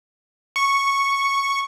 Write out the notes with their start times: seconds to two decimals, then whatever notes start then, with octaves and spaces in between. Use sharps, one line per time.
0.56 C#6